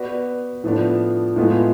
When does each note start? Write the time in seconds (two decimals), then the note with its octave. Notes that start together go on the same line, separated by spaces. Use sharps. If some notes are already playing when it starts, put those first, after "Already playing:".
Already playing: B3 F#4 B4 D5
0.63 A2 F3 B3 D4
1.36 A2 G#3 B3 F4